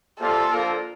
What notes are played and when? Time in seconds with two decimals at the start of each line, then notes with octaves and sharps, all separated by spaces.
0.20 C3 G3 A#3 F4 A4
0.51 D3 F3 A#3 F4 A#4